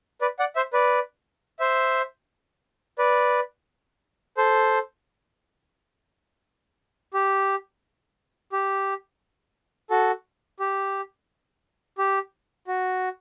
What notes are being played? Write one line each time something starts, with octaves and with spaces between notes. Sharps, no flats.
B4 D5
D5 F#5
C5 E5
B4 D5
C5 E5
B4 D5
A4 C5
G4
G4
F#4 A4
G4
G4
F#4